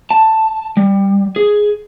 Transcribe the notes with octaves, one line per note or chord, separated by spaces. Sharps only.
A5
G3
G#4